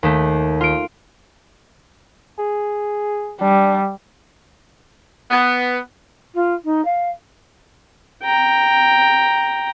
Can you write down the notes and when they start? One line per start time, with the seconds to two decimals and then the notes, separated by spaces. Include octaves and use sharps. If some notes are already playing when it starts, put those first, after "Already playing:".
0.03 D#2 A3
0.61 F4 D7
2.39 G#4
3.41 G3 D4
5.31 B3
6.34 F4
6.64 D#4
6.85 F5
8.23 G5 A#5